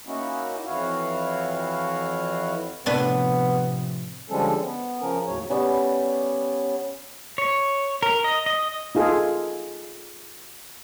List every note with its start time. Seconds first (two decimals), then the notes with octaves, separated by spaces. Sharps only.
0.07 A#3 C#4 D#4 E4 F#4
0.66 F2 E3 E4 F#4 C#5 F5
2.86 A2 C3 F3 B3 D4 B4
4.30 D3 F3 G3 G#3 C#4 A4
4.62 B3
5.00 C#3 F3 C#4 A#4
5.26 D#2 A2 C#3 F#3 C#5
5.50 G3 B3 C#4
7.38 C#5
8.03 A#4
8.24 D#5
8.46 D#5
8.95 D#4 F4 G#4 A4